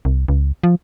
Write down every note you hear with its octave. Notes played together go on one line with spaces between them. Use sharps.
C2
C#2
F3